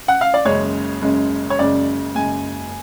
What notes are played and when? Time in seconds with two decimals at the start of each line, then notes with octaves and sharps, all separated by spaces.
0.08 F#5
0.21 F5
0.34 D5
0.45 F#1 F#2 C#3 G#3 C#5
1.02 F#1 F#2 C#3 G#3
1.50 C#5
1.59 F#1 F#2 C#3 G#3 D5
2.14 F#1 F#2 C#3 G#3 G#5